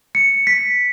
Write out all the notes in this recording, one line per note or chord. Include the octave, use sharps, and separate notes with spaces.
C#7
B6